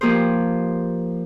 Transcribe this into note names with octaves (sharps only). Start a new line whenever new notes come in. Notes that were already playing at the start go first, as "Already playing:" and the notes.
F3 A#3 G4 G#4 C5